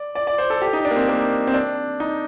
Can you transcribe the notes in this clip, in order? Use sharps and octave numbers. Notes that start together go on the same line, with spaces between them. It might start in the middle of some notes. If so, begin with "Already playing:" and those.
Already playing: D5
D5
D5
C5
A4
G4
D#4
D4
A#3
C4
A#3
C4
D4
D#4